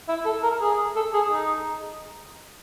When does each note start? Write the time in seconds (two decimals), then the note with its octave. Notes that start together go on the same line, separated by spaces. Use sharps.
0.08 E4
0.25 A4
0.43 A#4
0.61 G#4
0.96 A4
1.13 G#4
1.30 D#4